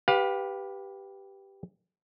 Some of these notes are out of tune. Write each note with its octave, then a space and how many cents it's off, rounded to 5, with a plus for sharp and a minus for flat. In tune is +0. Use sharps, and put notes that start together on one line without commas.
G4 +0 B4 +0 F5 +30